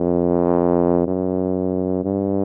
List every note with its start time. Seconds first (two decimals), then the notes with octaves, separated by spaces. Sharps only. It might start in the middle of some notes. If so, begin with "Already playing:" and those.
Already playing: F2
1.08 F#2
2.04 G2